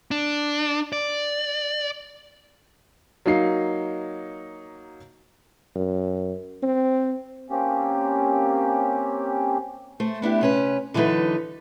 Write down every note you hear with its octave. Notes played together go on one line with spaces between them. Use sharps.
D4
D5
F#3 A#3 D#4 C7
F#2
C4
A#3 C4 C#4 G4
A3 C5
B3 D4 E4 G4
C3 C#4 B4
D3 E3 F#3 D#4 A4 B4